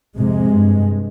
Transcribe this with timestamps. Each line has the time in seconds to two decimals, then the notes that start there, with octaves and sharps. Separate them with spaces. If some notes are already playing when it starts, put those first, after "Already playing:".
0.16 F2 C3 G#3
0.53 G2